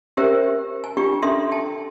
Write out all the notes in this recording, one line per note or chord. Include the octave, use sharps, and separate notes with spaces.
C#4 G4 A#4 C5 E5 G5
G#5
D4 F4 G4 G5 C#6
C#4 D4 A4 E5 C6 D#6
G5 A5